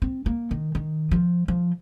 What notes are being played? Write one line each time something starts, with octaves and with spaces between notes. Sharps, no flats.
C4
A#3
D#3
D#3
F3
F3